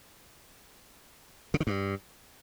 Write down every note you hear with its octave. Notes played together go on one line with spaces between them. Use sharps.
C#3
D#3
G2